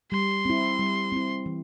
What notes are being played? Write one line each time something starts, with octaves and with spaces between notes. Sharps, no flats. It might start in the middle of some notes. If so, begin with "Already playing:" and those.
G3 C6
C4 E4
G3
C4 E4
E3